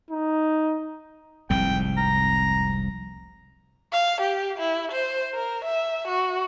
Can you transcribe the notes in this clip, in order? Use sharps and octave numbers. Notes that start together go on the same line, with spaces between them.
D#4
F1 C2 G#2 G5
A#5
F5
G4
E4
C5
A#4
E5
F#4